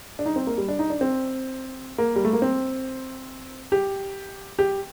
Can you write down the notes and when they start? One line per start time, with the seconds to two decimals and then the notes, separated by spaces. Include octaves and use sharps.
0.19 D4
0.26 D#4
0.36 C4
0.47 A#3
0.58 G3
0.68 D4
0.79 D#4
0.90 D4
1.01 C4
1.98 A#3
2.16 G3
2.25 A3
2.33 A#3
2.42 C4
3.72 G4
4.59 G4